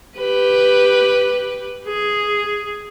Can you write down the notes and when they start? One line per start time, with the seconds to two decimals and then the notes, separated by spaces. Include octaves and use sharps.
0.16 G4 B4
1.87 G#4